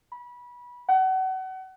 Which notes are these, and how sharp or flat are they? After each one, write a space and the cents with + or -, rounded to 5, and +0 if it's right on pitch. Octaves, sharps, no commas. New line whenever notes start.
B5 -25
F#5 +30